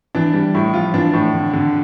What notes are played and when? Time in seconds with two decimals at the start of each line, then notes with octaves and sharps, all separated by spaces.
0.15 E3 D4
0.34 G3
0.54 A2 E4
0.74 F3 F4
0.94 E3 D4
1.13 A2
1.34 D3
1.53 D3